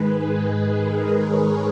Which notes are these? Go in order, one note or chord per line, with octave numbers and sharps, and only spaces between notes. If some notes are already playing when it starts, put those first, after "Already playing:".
Already playing: G#2 D#3 G#3 G#4 B4
G#4
A#4
C#5